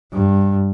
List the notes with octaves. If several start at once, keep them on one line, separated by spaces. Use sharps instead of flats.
G2